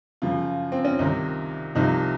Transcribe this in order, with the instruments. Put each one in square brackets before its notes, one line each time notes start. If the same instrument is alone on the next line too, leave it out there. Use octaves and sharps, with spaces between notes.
[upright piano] F#2 C#3 F3 F4
C4
C#4
C2 C3 D#3 D#4
C2 C3 F3 D#4